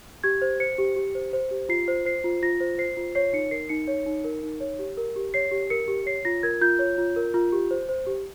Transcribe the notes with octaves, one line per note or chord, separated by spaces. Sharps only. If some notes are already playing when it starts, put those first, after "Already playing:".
G4 G#6
C5
C5 C#7
G4
G4
C5
C5
G4
F4 C7
C5
C5 C7
F4
F4 A#6
C5
C5 C7
F4
C#5 C7
D#4 C#7
A#4 C7
D#4 C#7
C#5
D#4
A#4
D#4
C#5
G4
A#4
G4
C#5 C7
G4
A#4 C#7
G4
C#5 C7
F4 A#6
A#4 G#6
F4 G6
C#5
F4
A#4
F4
G4
C5
C5
G4